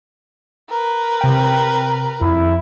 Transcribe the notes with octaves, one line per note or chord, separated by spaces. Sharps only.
A#4 B4
C3 G5
F2 E4